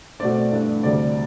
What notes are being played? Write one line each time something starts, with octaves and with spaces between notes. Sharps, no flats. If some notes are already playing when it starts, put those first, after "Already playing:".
B2 A3 C4 D5
G2 E3 A3 D4
D2 C3 G3 C4 D5